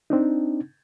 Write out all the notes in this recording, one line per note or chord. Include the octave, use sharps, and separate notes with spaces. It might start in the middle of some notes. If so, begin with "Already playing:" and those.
C4 D4 D#4